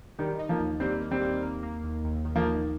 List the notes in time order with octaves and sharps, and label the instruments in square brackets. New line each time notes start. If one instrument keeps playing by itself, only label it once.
[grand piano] D#3 G3 [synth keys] D#4
[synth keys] D#4
[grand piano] F3 A#3
[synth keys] D#2
[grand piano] G3 C4 [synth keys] A#3
[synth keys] A#3
[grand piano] G3 C4
[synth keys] A#3
A#3
A#3
D#2
D#2
D#3
[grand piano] F3 A#3
[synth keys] D#3